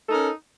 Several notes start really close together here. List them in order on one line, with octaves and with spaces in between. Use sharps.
D#4 A4 A#4 C#4